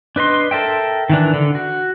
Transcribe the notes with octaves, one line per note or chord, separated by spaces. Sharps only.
D4 B4 D#5 C6
A4 A#4 E5 G5
D#3 E3 D4
D3
F#4